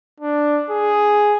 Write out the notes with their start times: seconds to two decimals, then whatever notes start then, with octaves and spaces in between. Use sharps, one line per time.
0.20 D4
0.70 G#4